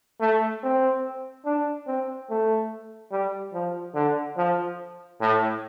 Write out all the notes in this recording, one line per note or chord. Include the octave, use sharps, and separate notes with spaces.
A3
C4
D4
C4
A3
G3
F3
D3
F3
A2